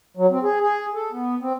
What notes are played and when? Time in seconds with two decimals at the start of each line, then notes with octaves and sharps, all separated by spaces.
0.17 F#3
0.30 C4
0.43 G#4
0.62 G#4
0.95 A4
1.12 B3
1.41 C4